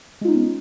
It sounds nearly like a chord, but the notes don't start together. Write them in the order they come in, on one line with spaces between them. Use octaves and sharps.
G#3 F4 D#4 C#4 B3